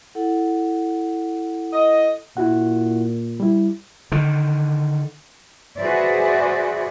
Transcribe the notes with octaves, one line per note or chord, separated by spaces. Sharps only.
E4 A4 F#5
D#5
A#2 E4 F#4 F#5
G3 E4
D3 D#3
F#4 G#4 B4 C5 D5 E5